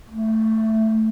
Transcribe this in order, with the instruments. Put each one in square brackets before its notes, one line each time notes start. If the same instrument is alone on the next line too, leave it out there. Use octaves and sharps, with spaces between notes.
[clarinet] A3